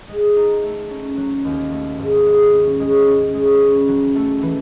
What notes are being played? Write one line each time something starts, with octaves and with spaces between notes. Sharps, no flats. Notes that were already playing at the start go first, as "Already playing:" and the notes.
G#3
D#4
A3
C#4
F#3
D#2
A3
G#2
G#3
C#4
G#3
C#4
G#3
C#4
F#3
A3
E3